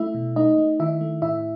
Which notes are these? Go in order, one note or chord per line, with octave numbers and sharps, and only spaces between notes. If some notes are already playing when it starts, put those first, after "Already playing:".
Already playing: A3 E4 E5
B2
A3 D#4 D#5
A3
D#3 E4 E5
A3
A2 E4 E5